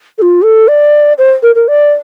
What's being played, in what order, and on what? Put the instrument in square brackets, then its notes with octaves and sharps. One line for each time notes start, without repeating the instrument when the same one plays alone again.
[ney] A4
F4
A4
D5
C5
A#4
A#4
D5